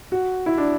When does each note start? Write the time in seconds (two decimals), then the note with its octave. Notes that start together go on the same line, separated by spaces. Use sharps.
0.12 F#4
0.46 E4
0.58 D4